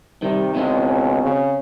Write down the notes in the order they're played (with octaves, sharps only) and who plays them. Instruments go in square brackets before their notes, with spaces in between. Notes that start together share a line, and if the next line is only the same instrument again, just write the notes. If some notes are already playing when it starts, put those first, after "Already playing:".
[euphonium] C3 [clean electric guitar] D#3 [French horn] G3
[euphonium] C#2 [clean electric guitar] B2 G#3 [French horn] C4
[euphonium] C#3